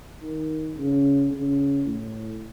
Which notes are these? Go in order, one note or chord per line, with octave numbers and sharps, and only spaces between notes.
D#3
C#3
C#3
A2